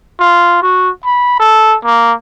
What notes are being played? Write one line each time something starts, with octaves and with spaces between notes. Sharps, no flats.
F4
F#4
B5
A4
A#3